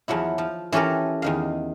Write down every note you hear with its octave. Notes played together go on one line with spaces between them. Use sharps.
E2 F3 F#3 E4
F3
E3 C#4 G4 A4 A#4
E2 D#3 F5